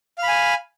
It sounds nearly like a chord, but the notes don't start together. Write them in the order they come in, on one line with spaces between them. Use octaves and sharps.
F5 B5 G#5